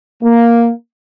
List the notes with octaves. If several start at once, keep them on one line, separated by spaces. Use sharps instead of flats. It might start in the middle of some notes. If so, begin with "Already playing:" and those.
A#3